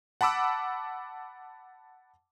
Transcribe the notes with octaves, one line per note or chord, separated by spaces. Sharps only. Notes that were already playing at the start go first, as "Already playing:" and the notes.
F#5 A5 B5 D6 E6